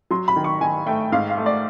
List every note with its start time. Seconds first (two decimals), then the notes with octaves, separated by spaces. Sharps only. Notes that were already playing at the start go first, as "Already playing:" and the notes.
0.11 F#3 C6
0.28 B5
0.36 D#3
0.44 C#6
0.61 D#3 G#5
0.86 A3 G5
1.12 G#2 F5
1.30 F5
1.38 A3
1.46 D5